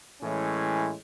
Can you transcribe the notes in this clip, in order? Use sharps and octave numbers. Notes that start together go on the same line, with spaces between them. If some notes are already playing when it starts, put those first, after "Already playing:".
A2 E3 G#3 C#4